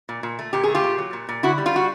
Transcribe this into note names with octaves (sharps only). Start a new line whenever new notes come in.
A#2
A#2
A3
A#2 G4
A3 G#4
F4 G4
A#2
F#3
A#2
A#2
D3 E4 F#4
G3
F4
G3 F#4